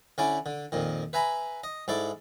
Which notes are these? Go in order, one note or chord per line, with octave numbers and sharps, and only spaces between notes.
D3 C#4 E4 D5
D3
F2 A#2 D#3
B4 E5 G#5 A#5 B5
D#5
G#2 E4 A4 D5